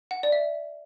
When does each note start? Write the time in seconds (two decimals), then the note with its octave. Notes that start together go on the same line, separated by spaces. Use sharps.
0.11 F#5
0.23 D5
0.32 E5